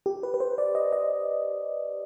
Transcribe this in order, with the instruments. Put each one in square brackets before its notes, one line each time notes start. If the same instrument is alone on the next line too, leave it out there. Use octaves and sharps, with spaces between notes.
[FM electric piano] G4
B4
B4
C5
D5
D#5
D#5